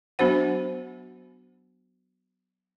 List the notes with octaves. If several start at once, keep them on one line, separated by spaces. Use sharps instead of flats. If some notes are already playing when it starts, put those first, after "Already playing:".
F#3 B3 D4 F#4 C5 F#5